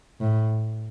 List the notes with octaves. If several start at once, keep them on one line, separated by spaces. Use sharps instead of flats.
A2